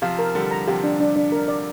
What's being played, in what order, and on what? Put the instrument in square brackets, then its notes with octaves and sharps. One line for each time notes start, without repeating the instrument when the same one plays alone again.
[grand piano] C3 F3 [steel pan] F5
[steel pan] A#4
[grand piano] D3 G3 [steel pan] A#4
[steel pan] A#5
[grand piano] C3 F3 [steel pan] G4
[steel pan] D4
D4
D4
A#4
D5